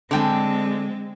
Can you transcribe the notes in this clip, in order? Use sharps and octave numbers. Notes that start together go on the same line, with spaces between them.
D3 G#3 C4 G5 G#5